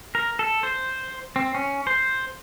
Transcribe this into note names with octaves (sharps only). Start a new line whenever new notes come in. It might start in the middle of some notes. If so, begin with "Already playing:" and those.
A#4
A4
C5
C4
C#4
C5